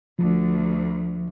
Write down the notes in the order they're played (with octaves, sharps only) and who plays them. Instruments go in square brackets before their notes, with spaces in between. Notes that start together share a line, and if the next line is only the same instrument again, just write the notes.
[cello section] D2 [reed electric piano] F3